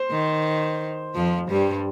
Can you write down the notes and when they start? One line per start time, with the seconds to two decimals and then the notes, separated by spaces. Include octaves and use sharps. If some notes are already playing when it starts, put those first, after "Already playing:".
Already playing: C5
0.11 D#3
1.15 F2 F3
1.49 G2 G3